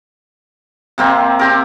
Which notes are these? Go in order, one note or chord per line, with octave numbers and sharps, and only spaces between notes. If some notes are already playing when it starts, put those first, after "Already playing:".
C3 A#3 C4
C4 G4 A#4